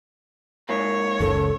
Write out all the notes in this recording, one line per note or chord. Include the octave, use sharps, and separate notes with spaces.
G#2 A#3 C#5
F#1 C#2 C#3 A4